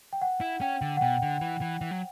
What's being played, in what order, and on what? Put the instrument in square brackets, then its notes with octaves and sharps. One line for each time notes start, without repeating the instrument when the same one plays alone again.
[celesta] G5
F#5
[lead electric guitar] E4
[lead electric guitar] C#4 [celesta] G5
[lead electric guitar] D3
[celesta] F#5
[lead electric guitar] B2 [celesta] G5
[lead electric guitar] D3
E3
E3
E3
F#3